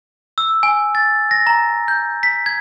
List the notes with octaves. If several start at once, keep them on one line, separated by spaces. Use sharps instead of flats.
E6
G#5
A6
A#6
A#5
G6
B6
G#6